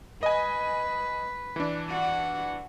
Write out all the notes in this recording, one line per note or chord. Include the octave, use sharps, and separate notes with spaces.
B4 D#5 G#5
E3 D4
F#4